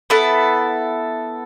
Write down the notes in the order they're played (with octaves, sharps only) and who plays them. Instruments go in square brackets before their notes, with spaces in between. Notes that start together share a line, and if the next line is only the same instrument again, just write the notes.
[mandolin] B3 E4 A4